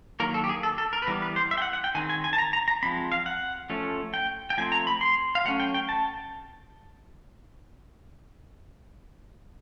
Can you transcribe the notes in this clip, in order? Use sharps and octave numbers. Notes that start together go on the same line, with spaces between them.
D#3 F#3 A#3 A#4
A4
G4
G#4
A4
A4
A#4
B4
E3 G3 B3 A#4
B4
C5
E5
G5
F#5
F#5
G5
D#3 G#3 C4 G#5
G#5
G#5
A5
A#5
A#5
A#5
F3 G#3 C4 B5
F5
F#5
F3 A3 C#4
G5
G5
F3 A3 C4 G#5
A#5
B5
C6
F5
F#3 A3 C#4 F#5
G5
G5
A5